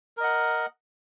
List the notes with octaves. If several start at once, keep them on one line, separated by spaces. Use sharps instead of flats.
A#4 D#5 F#5